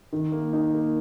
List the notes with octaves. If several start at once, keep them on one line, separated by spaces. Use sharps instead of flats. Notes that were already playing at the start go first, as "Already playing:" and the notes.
D#3
A#3
D#4
A#3